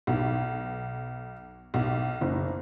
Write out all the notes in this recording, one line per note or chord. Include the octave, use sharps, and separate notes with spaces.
B1
B1
F#1